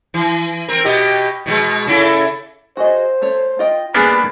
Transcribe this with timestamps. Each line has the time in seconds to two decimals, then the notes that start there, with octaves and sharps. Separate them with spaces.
0.14 E3
0.68 C4 A#4
0.85 B2 G4 D#5
1.46 B2 F3 G#3
1.87 C#3 E4 A4
2.77 F#4 G#4 C5 D#5
3.22 A3 C#5
3.59 F4 D#5 G5
3.94 G3 A#3 B3 D4 G#4 B4 B5